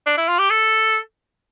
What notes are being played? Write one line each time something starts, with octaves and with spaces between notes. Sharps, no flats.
D4
E4
F4
G4
A4